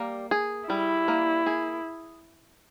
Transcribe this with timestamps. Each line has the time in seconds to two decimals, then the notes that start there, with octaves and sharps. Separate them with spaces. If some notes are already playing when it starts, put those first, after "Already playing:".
Already playing: G3 A#3
0.31 G#4
0.70 G3 E4
1.08 A#3
1.46 G#4